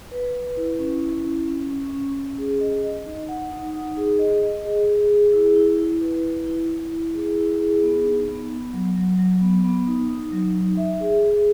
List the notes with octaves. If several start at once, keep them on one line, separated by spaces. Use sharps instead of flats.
B4
B4
E4
C#4
E4
C#4
C#4
C#4
C#4
C#4
G#4
D#5
D#5
D#4
F#5
D#4
D#4
G#4
D#5
D#5
G#4
G#4
G#4
E4
E4
E4
B4
E4
E4
E4
E4
G#4
E4
G#4
B3
D#4
B3
B3
F#3
F#3
F#3
B3
B3
D#4
D#4
F#3
D#4
E5
G#4
G#4